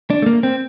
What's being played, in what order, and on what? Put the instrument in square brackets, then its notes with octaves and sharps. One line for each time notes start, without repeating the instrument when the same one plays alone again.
[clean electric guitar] D4
A3
A#3
C4